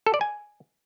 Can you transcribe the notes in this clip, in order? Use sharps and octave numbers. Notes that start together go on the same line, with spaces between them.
A4
D5
G#5